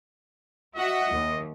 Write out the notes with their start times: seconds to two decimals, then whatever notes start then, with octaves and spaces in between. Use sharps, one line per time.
0.76 F#4 D#5 E5 F#5
1.11 D#2